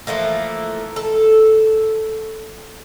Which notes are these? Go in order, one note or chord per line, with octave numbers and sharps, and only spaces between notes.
E3 F3 A3 A#3
A4